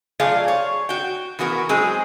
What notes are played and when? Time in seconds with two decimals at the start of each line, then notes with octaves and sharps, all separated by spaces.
0.20 F#3 A3 F4 G#4 D5 F5
0.48 C#5
0.89 F#4 G5
1.39 E3 B3 F#4 A#4
1.69 F#3 G#3 C4 G#4